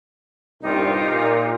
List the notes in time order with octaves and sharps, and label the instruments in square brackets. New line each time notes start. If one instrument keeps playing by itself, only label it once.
[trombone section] C2 G2 A#2 [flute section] D#4 F4 G4
[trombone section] A#2